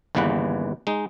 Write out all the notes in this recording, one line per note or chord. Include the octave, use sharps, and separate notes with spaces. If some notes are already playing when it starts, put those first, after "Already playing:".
G1 D#2 C#3 E3 B4 F#5
G#3 D#4